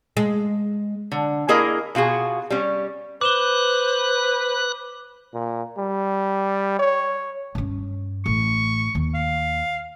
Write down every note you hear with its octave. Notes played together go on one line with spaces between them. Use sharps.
G#3
D3
A#3 E4 G#4 A#4 D#5
B2 F4 F#4 G#4
G3 C#4
B4 C5 D6 F#6 E7 G7
A#2
G3
C#5
G2 C#4
A1 C#6
D#2
F5